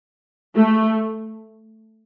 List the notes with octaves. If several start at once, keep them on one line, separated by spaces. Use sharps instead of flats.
A3